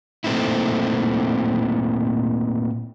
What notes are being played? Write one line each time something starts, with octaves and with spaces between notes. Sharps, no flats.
A#2 A3 C4 D#4 E4